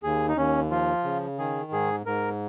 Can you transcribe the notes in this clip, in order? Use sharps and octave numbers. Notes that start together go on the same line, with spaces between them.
D#2 G#4
D#4
D#2 C#4
F3 F4
C#3
D#3 G#4
G#2 G#4
G#2 A#4